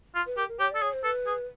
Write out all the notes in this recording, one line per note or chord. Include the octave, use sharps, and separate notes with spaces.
F4
B4
G4 A#4
A#4
G4 C#5
A4 D5
G#4 C#5
C5
A4 B4
G#4